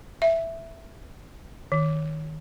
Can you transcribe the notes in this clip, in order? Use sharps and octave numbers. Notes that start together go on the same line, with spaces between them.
E5
D#3